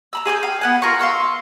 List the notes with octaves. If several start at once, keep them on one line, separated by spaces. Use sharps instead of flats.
A#5 B5 E6
G#4 G#5 D6 G6
F5 G5
B3 F#5 G#5
F4 A#4 C#6
F5 C6 C#6 E6